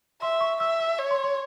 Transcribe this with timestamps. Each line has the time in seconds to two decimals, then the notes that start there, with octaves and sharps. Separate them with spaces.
0.21 E5 C6
0.41 C#6
0.60 E5 E6
0.80 E6
0.99 C#5
1.11 C6
1.23 C6